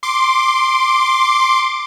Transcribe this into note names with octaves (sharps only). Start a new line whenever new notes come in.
C6 D6